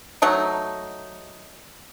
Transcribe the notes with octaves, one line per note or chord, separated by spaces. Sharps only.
F#3 A3 D#4